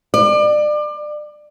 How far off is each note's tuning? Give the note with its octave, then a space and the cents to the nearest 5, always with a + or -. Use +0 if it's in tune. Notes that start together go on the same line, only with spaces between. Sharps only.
D5 +30